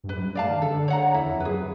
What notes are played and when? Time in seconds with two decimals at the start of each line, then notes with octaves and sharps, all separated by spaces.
0.04 G2
0.09 F#2 B4
0.22 G2
0.35 A2 D5 F5 A5
0.49 D#3
0.62 D3 A4
0.88 C#5 F#5 A#5
1.14 E2 E4
1.29 F2
1.40 F#2 G#4 B4